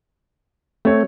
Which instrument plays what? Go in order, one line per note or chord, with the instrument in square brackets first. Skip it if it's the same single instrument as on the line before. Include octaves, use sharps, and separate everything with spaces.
[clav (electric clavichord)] A3 [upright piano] C4 C#5